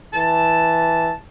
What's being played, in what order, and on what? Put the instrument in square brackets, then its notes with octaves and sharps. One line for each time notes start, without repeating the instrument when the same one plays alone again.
[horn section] E3 A5